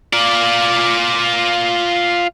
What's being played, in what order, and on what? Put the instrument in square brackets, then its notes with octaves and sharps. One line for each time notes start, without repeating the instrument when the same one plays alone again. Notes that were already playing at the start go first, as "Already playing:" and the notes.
[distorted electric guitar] F4 D5